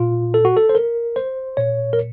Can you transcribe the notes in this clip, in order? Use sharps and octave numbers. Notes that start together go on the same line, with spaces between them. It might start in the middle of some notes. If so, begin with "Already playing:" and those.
Already playing: A#2 F4
A4
F#4
A4
C5
A#4
C5
A#2 C#5
A#4